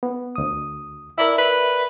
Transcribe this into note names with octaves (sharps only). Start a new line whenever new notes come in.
B3
D2 D#6
E4 A#4 D5 E5
B4